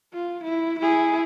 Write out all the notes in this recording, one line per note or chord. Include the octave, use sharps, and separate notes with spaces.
F4
E4
E4 G#4